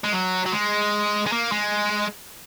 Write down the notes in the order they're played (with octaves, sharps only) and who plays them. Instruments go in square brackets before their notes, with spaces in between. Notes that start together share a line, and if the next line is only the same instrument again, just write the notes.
[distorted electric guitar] G#3
F#3
F#3
G#3
G#3
A#3
G#3